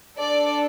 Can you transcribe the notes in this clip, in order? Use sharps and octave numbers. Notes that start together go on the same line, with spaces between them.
D4 A4 D5